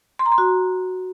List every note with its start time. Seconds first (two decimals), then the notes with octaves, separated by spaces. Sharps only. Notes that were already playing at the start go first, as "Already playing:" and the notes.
0.19 C6
0.26 A#5
0.32 C6
0.38 F#4